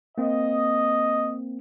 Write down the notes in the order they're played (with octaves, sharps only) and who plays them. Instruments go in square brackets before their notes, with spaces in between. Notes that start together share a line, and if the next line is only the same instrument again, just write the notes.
[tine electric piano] A#3 C4 [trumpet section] D#5